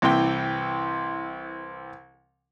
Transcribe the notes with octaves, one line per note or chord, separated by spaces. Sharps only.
C2 C3 E3 G5